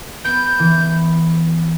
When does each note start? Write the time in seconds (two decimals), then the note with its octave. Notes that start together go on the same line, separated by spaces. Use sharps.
0.25 B3 G6
0.59 E3